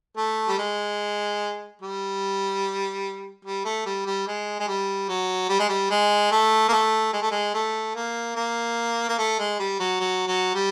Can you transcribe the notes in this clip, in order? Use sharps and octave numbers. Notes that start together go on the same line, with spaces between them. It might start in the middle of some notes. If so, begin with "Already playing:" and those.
A3
G3
G#3
G3
G3
A3
G3
G3
G#3
G#3
G3
F#3
G3
G#3
G3
G#3
A3
A#3
A3
G#3
A3
G#3
A3
A#3
A#3
A#3
A3
G#3
G3
F#3
F#3
F#3
G3